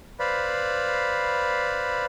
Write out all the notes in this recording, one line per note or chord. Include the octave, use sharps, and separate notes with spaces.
B4 C5 D5 F5 B5